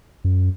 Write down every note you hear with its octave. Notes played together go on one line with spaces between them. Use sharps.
F#2